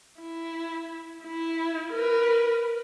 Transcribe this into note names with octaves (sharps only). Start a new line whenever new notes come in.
E4
E4
A#4 B4